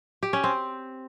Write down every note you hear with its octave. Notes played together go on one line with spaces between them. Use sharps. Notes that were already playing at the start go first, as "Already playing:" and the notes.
G4
C#4
C4